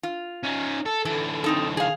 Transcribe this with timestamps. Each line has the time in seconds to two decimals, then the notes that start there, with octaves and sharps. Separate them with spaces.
0.03 F4
0.43 C#4 D#4
0.85 A4
1.05 D3 E3 A4
1.44 C4 D#4 A4
1.77 G#4 F5